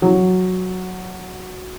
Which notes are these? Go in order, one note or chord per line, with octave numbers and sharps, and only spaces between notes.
F#3